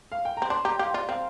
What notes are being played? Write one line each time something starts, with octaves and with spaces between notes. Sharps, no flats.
F5
G5
C4 A#5
D4 C6
G4 A#5
G4 F5
F4 D5
C4 F5